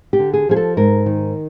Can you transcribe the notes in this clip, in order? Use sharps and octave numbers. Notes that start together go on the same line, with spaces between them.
G4
D3
G#4
F3 G#4
A4
G#2 A#4
D#3